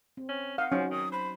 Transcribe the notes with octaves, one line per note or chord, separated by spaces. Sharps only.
C4
C#4
D#4 F5 F#5
F3 F#3 C#4 D#4
D#3 D#6
C5 B5